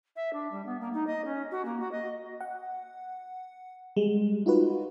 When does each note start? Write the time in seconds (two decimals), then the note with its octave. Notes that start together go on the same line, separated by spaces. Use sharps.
0.16 E5
0.33 D4
0.51 G3
0.66 B3
0.80 A#3
0.93 D#4
1.07 D#5
1.25 C#4
1.51 F#4
1.65 A#3
1.80 F#4
1.91 D#5
2.41 F#5
3.96 G3 G#3
4.46 D#4 F4 F#4 B4